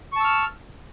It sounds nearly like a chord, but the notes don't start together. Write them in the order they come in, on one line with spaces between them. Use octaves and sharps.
C#6 A5 E6 F6